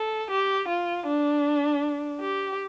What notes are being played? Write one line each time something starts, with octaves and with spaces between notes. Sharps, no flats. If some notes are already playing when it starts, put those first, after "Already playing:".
Already playing: A4
G4
F4
D4
G4